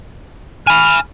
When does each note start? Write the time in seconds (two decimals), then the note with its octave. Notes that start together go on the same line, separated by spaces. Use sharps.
0.67 G#5 B5 F6